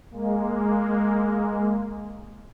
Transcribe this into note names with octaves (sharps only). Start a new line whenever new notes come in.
G#3 A#3